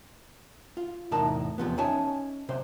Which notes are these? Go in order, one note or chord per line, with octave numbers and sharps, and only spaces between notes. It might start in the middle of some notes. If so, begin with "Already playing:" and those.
F4
E2 A2 C3 D#4 A#4 A5
E2 C3 F3 B3
C#4 D#4 C#5 E5 G#5 A5
B1 C3 C5